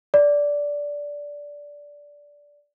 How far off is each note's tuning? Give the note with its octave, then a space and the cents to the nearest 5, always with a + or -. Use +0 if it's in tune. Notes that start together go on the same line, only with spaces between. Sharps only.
D5 -10